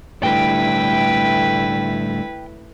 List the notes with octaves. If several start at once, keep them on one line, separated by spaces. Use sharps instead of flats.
A2 D3 G3 A3 E4 B4 G5